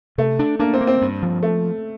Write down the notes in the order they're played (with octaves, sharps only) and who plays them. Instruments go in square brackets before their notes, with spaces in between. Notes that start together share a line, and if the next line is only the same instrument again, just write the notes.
[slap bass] C3 [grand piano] A3
[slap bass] D4
[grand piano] A#3 [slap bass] D4
[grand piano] C4
[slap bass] A#3
[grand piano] C4
[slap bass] G2
F3
[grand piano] A3